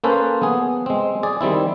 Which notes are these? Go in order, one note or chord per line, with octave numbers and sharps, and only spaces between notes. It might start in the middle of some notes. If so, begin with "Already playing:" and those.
A#3 C#4 A4 B4 C5
B3 G#4
G#3 C4
G#4 D5
D#3 G3 C4 E4